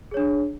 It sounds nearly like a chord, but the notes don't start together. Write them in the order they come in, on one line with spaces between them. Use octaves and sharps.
G#4 C#5 D4